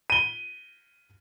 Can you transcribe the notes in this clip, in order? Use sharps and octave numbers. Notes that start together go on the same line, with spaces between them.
D#7 G7